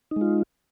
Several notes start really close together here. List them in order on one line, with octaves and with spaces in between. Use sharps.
D#4 G#3 F4